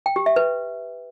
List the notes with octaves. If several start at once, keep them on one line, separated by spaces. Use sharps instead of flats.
G5
G4
E5
B4